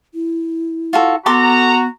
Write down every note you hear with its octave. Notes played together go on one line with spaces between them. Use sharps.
E4
F4 F#4 A4
B3 F#4 A4 A#5 C6 D6